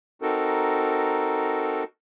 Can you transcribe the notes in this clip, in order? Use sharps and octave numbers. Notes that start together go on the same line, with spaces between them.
C4 D#4 F#4 A4 A#4